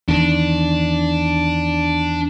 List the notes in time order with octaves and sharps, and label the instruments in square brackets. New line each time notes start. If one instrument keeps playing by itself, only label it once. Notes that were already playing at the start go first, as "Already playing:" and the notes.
[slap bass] E2 D#3 [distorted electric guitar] D4